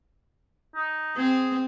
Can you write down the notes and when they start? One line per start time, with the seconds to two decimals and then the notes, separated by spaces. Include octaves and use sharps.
0.75 D#4
1.17 C4 G#4